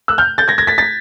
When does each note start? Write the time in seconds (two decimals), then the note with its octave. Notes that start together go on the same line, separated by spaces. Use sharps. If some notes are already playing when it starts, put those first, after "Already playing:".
0.08 E6 F#6
0.18 F6 G6
0.38 G6 A6
0.48 G#6 A#6
0.58 G#6 A#6
0.67 A6 B6
0.78 A6 B6